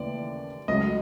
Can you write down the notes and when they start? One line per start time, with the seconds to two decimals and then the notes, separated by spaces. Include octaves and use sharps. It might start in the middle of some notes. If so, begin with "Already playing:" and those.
Already playing: D#2 C#3 E3 A3 D5
0.68 C#2 C#3 F#3 A3 D#5